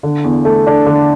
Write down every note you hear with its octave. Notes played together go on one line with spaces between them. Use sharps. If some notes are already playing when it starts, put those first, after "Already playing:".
D3
E2
A3
D4
D3